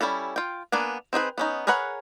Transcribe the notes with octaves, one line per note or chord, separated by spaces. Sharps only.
G3 C#4 E4 A4
F4 G5
A#3 B3 D4 G#5
C4 D#4 G#4 B4
B3 C#4 D#4
G#4 A#4 B4 C#5 F#5